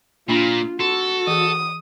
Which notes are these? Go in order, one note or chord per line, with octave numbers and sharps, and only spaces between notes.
A#2 A#3 D4 F4 B5
F#4 A4 C6
E3 G#4 D#6